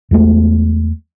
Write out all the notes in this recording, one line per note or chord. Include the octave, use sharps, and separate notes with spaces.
E2 G#3 A3